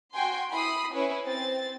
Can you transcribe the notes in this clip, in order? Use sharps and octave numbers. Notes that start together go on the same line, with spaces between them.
F#4 G5 G#5 C6
E4 B5 D#6 C7
C#4 E4 B4 C#5
C4 A6